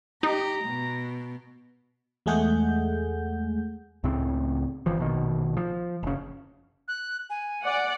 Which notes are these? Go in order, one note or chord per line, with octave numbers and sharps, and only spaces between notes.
D#4 G4 A#5
B2
E2 G#3 A3 G#4 F#5 G6
C#2 A2 C#3 C4
G1 E3 F3
A#1 B2 D#3
F3
F#1 C#3
F#6
G#5
D5 F#5